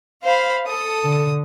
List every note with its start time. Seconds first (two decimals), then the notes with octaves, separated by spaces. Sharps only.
0.24 C5 F5 B5
0.67 A4 D#6
1.05 D3